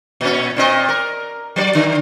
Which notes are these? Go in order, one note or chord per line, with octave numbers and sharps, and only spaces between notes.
A#2 C#4
A#2 C4 D#5
A#4
F#3 B4 D5
D3